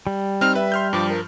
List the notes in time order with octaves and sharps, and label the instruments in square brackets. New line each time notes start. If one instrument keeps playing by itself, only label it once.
[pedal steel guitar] G3
[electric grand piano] C4 D#4 [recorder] F6
[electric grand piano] B4 [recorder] E5
[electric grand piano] C6 F6 G6
[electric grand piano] G2 F3 [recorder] D6
[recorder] A#4